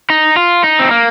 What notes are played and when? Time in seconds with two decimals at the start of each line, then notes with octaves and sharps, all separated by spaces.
0.10 D#4
0.36 F4
0.64 D#4
0.79 C4
0.91 A#3